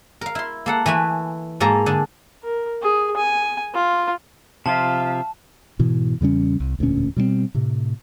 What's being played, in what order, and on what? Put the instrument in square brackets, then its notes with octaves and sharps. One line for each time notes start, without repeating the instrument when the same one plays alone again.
[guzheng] A#4 F5
E4 C6
A#3 A4 F#5
E3 A3 B4 G#5
G#2 A#3 A4 G#5 A#5
D3 D4 G#4
[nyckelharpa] A#4
G#4
G#5
F4
[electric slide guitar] C3 F3 F4 [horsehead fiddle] E5 F5 [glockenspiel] A5
[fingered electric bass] G#2 B2 E3
E2 C#3 G3 C#4
C2
E1 D2 A#2 C#4
B2 G3 A#3 C4
A2 C3